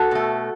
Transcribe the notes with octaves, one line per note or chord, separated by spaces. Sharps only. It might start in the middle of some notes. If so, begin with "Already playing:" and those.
Already playing: F#4 A4
B2 A3